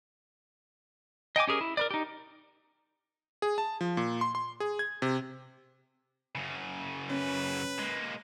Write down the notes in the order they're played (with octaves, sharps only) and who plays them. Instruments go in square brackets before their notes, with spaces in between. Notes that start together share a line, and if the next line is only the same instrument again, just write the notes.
[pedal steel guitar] D#5 G5 G#5 D6
C#4 G4 G#4 A#4
E4
A#4 B4 D5
D#4 G4
[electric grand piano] G#4
A5
F3
A#2
C6
C6
G#4
G#6
C3
[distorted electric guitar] F#2 C#3
[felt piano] C#4 [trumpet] B4
[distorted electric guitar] G#3 A#3